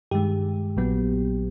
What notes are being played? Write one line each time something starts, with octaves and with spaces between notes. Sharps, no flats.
G2 D#3 G#3 G4
A#1 A#2 F#3 B3